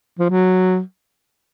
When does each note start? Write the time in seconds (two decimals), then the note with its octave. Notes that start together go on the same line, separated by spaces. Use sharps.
0.19 F3
0.30 F#3